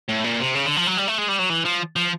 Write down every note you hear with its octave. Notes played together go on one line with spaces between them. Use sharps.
A2
A#2
C3
C#3
D3
F3
F#3
G3
A3
G#3
G3
F#3
E3
F3
F3